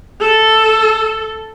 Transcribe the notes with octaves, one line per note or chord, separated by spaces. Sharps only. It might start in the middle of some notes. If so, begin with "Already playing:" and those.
A4